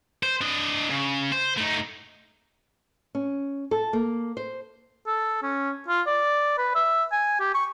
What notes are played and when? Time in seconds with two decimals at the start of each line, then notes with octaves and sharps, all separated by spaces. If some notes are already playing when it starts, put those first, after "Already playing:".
0.23 C5
0.41 D4 D#5
0.89 C#3
1.32 C5
1.57 A3 D#4
3.15 C#4
3.71 A4
3.93 A#3
4.37 C5
5.07 A4
5.43 C#4
5.88 F4
6.07 D5
6.58 B4
6.75 E5
7.12 G#5
7.40 G4
7.54 C#6